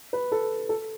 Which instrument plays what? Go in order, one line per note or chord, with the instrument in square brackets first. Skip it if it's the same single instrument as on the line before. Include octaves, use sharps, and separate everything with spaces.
[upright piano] B4
A4
A4